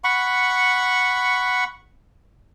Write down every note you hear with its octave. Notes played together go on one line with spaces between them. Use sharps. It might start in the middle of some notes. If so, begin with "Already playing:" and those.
F#5 B5 C#6